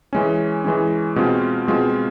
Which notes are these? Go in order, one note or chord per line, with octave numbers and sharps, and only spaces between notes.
E3 G#3 C#4
E3 G#3 C#4
B2 G#3 C4 F4
B2 G#3 C4 F4